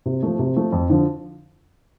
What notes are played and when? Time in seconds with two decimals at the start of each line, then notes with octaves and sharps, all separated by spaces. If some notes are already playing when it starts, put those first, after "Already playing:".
0.06 C3
0.23 F3 A3
0.39 C3
0.56 F3 A3
0.72 F2
0.90 D3 F3